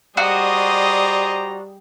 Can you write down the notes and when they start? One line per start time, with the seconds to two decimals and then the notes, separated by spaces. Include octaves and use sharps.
0.17 G3 F#4 G#4 C5 D5 D#5 A#5